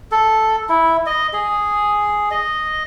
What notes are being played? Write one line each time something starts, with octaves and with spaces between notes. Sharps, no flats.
A4
E4
D#5
G#4
D#5